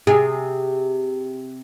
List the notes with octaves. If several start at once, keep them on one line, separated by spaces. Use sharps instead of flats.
C3 G#4